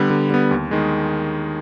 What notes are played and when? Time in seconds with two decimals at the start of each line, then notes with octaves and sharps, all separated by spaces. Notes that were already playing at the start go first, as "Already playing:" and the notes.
Already playing: D3 G3 B3
0.10 D3
0.30 G3 B3
0.51 D#2
0.71 D#3 G#3